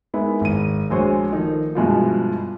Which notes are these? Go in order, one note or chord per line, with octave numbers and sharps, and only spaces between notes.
G#3 A#3 B3 D#4 E4
G#1 D#7
A#1 G#3 F#4 C5 C#5
D#3 F3 A3 D#4
G2 B2 F3 G#3 E4 F4